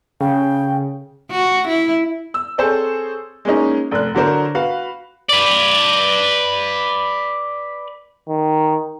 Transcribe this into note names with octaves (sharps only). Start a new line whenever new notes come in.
C#3 G5
F#4
E4
E6
C4 G#4 A4 C5 C#5
G#3 A#3 C#4 D#4
F1 F#6
D3 F#3 D4 A#4 C5
F#4 B4 F5
B4 D5
D#3